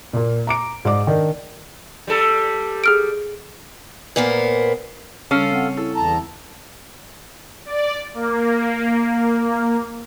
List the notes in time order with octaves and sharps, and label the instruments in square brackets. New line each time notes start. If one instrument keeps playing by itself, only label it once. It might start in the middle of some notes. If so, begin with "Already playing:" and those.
[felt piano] A#2 A#3
A#5 D6 D7
G#2 D5 D6
D#3 D4 A#4
[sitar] G3 A4
[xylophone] G#4 F6 D7
[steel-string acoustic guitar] A#2 A#3 B3 A#4 C5
[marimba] C#3 G3 [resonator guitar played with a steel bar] C#4 [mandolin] F4 A4 F5
[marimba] C4 F#5
[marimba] E4 [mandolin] A4
[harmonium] E2 A5 A#5
[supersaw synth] D5
A#3